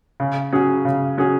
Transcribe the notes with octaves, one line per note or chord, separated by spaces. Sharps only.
C#3
F#3 C#4 G#4
C#3
F#3 C#4 G#4